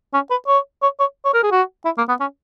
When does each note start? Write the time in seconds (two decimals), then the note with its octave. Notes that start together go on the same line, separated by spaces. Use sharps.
0.14 C#4
0.30 B4
0.48 C#5
0.82 C#5
1.00 C#5
1.25 C#5
1.34 A#4
1.43 G#4
1.51 F#4
1.85 E4
1.98 A#3
2.09 B3
2.20 C#4